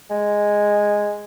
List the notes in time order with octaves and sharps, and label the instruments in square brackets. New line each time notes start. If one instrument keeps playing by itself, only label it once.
[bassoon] G#3